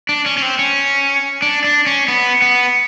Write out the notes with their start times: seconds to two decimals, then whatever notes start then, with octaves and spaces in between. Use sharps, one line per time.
0.09 D4
0.26 C#4
0.37 C#4
0.42 C4
0.59 C#4
1.42 D4
1.64 D4
1.86 C#4
2.08 B3
2.42 B3